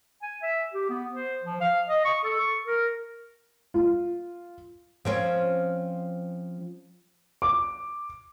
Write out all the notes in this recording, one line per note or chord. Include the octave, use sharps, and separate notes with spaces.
G#5
E5
G4
B3
C5
F3
F5
D#5
C#6
A4
C#6
A#4
F4
F3 C4 C#4
D6